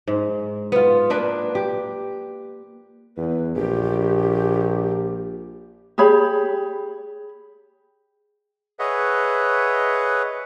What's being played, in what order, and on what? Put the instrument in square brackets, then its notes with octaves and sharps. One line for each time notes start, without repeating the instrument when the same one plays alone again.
[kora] G#2
B3 F4
A#3 D4 B4
G4
[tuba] E2 [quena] B4
[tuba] A#1 [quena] G4
[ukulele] G4 G#4 C#5 B5
[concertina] G#4 B4 C#5 D#5 E5 F#5